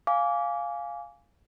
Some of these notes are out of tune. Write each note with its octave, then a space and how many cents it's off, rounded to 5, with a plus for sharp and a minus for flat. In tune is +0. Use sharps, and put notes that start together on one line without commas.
F5 +0 G#5 +0 D6 -25